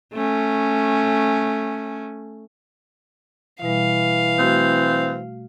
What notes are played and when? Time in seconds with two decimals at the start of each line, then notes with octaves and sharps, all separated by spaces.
0.14 A3 C#4
3.62 B2 E3 G3 F5
4.39 A3 C4 F#4